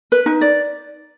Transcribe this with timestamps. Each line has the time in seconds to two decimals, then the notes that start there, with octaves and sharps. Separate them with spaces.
0.12 B4
0.26 D#4
0.41 D5